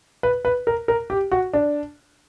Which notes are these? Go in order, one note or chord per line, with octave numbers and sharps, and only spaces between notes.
B4
B4
A#4
A#4
G4
F#4
D4